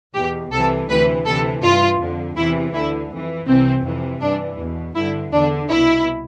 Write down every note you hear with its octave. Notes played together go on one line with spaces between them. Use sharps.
E2 B2 G4
C2 C3 E3 A4
D2 C3 E3 B4
D2 C3 E3 A4
G2 E3 F4
F2 D3
E2 C3 E3 E4
D2 D3 E4
F2 E3
C2 C3 E3 C4
F2 C3 E3
G2 E3 D4
E2 B2
G2 D3 E4
E2 D3 D4
C2 B2 E4